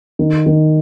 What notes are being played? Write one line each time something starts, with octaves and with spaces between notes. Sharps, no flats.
D#3
D#3